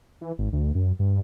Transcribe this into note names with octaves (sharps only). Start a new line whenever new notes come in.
E3
G#1
D2
F#2
G2